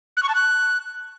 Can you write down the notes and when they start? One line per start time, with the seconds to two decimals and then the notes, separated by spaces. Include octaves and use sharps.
0.17 F#6
0.23 C#6
0.29 A5
0.35 F#6